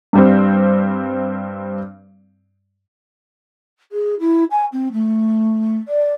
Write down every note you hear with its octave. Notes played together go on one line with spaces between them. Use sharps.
G2 G3 C4
G#4
E4
G#5
C4
A3
D5